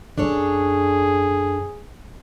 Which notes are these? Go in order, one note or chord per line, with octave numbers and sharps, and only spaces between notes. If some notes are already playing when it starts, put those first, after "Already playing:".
F#2 C#4 D4 G#4 A4 C#5